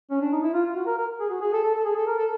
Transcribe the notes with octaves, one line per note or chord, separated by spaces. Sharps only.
C#4
D4
D#4
E4
F4
F4
F#4
A#4
A#4
G#4
F#4
G#4
A4
A4
A4
G#4
A4
A#4
A4